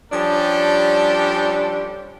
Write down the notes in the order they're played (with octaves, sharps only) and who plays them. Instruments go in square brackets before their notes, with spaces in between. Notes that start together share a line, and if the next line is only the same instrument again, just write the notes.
[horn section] F3 G3 C#4 D4 G4 A4